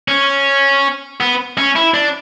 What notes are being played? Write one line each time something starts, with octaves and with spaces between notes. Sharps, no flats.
C#4
B3
C#4
E4
D4